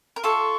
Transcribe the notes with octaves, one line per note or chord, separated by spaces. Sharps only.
A#4
F4 A4 C#6